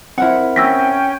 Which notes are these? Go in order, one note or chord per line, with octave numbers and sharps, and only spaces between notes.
C4 E4 A#4 C5 F#5
C#4 G5 E6 A#6 B6